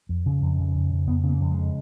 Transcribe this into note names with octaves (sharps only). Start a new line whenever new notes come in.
F2
C#3
F2
C#3
F2
C#3
F2 B3
C#3
A#3
F2
G#3
C#3